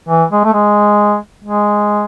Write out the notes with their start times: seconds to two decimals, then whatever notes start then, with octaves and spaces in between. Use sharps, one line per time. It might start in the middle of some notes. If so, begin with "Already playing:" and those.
0.08 E3
0.32 G#3
0.44 A3
0.54 G#3
1.44 G#3